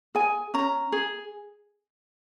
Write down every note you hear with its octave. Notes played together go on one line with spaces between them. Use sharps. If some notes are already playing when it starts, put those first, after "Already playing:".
G#4 G#5
C#4 A#5
G#4